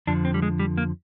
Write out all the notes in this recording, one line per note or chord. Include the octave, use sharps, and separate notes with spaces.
F2 D3 F3 D4
C4
G3
G#3
G3
A#3